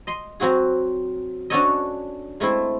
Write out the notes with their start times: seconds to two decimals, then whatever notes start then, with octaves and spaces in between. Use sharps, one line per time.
0.07 D#5 C6
0.40 F#3 C4 F#4 G#4
1.50 C#4 D4 F#4 A4 C#5 D#5
2.40 G#3 A3 C4 E4